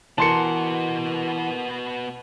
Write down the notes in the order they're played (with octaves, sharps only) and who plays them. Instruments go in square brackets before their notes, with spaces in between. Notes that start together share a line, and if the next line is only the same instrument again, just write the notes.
[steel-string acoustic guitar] E3 A#4 [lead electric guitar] B3 F#4 [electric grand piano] A5 C6 C#7